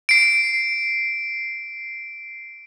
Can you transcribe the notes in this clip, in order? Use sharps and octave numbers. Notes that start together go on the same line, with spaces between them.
C7 D7